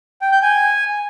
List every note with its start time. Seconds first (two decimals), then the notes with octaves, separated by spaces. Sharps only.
0.21 G5
0.32 G6
0.42 G#5